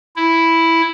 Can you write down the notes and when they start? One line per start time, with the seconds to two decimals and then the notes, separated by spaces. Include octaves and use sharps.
0.16 E4